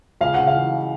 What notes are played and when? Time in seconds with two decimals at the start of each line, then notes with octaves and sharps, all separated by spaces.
0.21 C#2 F5
0.34 C#3 F#5
0.47 F5
0.55 E3